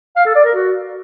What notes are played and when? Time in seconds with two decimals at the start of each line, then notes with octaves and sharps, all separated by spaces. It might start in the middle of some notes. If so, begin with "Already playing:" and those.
0.16 F5
0.25 A4
0.35 D5
0.45 A#4
0.54 F#4